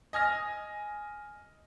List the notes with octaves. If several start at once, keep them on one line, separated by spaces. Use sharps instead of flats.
D#5 G#5 F6 A#6